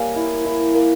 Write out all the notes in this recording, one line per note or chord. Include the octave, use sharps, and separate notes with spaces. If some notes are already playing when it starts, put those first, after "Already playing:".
Already playing: G3 A#3 A#4 C#5 F5 G#5
E4
E4
A#3